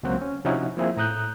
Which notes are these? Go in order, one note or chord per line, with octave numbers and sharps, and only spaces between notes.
C#2 F#3 A#3 C4 F#4 G5
C#4
C3 F3 C#4 D#4 E4 F#4
F3 A#3 C4 E4 G#4 E5
A2 A#5 D#6 F#6 G6